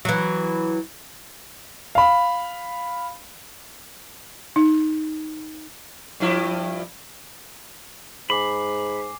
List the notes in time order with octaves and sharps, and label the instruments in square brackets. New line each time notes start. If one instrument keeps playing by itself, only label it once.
[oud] E3 F#3
[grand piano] F5 B5
[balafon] D#4
[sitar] G2 F3 E4
[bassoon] G#2 [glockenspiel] G#5 D6 C7 [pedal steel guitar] B5